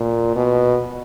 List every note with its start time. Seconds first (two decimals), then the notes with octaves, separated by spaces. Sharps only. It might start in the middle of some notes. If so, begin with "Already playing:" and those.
Already playing: A#2
0.36 B2